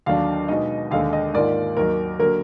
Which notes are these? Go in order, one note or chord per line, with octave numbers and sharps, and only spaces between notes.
D#2 D3 F#3 D4 F5
B2 G#3 D#4 D#5
D#2 D3 G#3 F5
D#5
G#2 D#3 A#3 F4 D5
D#2 D#3 F#3 A#4
D3 F#3 A#3 A#4